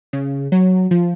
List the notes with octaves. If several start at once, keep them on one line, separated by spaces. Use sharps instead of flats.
C#3
F#3
F3